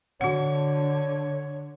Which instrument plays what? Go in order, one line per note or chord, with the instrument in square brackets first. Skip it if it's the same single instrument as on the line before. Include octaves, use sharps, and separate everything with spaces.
[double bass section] D3 [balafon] F#4 F#5 [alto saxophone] C#5